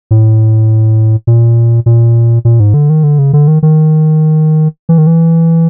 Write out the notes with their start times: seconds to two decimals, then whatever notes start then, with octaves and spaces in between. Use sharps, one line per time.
0.11 A2
1.27 A#2
1.86 A#2
2.45 A#2
2.60 G#2
2.74 D3
2.90 D#3
3.03 D3
3.19 C#3
3.33 D3
3.48 D#3
3.63 D#3
4.89 E3
4.98 D#3
5.07 E3